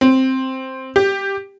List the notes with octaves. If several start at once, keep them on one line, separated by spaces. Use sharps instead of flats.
C4
G4